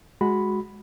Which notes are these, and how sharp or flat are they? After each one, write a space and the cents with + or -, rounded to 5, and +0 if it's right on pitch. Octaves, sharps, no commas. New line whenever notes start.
G#3 +0 F#4 +0 B5 +0